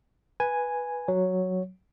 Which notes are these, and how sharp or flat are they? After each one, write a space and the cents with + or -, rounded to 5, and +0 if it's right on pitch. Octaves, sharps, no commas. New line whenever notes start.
B4 -5 G#5 +0
F#3 +0 C#5 +0